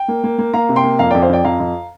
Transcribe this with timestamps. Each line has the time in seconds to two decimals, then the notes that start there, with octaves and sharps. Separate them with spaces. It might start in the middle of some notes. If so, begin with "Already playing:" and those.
Already playing: G5
0.08 A#3
0.24 A#3
0.38 A#3
0.54 A#3 F5 A#5
0.69 C3
0.76 G5 C6
0.84 A#3
0.99 F2 F5 A#5
1.11 F2 D5 G5
1.22 C5 F5
1.29 F2 D5 G5
1.45 F2 F5 A#5
1.60 F2